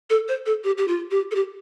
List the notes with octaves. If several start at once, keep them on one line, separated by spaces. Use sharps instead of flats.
A4
C5
A4
G4
G4
F4
G4
A4
G4